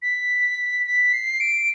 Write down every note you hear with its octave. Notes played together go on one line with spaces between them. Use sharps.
B6
B6
C7
D7